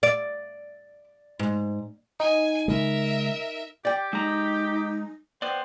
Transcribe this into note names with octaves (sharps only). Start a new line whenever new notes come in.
D5
G#2
D#4 G#5
C#3 G#3 A#4 E5
G4 D5 G5
G#3 D#4 A#5
B3 C5 D5 G5